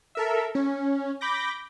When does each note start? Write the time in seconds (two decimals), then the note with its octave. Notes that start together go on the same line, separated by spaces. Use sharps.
0.15 A4 A#4 E5
0.55 C#4
1.21 B5 D6 G6 A#6